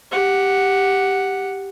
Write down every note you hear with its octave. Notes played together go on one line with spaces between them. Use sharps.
G4 F#5